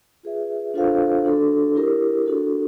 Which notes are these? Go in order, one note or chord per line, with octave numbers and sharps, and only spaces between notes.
F4 G#4 B4 E5
D4 F4 A4 C5 F5
D4 F#4 A4
E4 G4 A#4
D4 F#4 A4